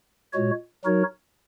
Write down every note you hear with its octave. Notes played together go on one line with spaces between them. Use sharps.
A#2 G#3 F#4 C#5
F#3 D#4 F#4 A#4 C#5